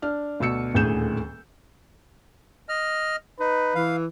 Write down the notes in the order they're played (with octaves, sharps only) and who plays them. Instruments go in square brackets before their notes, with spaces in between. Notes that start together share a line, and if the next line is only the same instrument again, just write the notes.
[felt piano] D4 F6
D2 B2 D4 E6 C#7
D#1 D2 A2 G#4 G6 E7
[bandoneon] D#5 F6
[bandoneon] D#4 [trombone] B4
[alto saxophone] E3 [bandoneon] F5